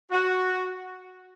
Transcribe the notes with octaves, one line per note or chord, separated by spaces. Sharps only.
F#4